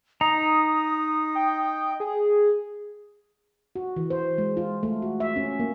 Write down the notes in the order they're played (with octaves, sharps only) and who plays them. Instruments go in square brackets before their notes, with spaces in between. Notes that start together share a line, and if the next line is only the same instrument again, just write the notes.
[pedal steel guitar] D#4 A#5 [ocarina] D#6
[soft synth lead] G5
G#4
[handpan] F#4
E3
C5
G#3
F4
A3
F#4
E5
C#4
A#3